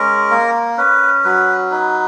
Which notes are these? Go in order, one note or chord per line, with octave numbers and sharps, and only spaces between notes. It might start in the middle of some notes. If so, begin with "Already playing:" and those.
Already playing: G#3 C#4 A#4
A#3
C#4 B4
F#3 B4
D#4 B4